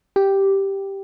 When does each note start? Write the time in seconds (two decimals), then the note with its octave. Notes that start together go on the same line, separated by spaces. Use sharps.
0.16 G4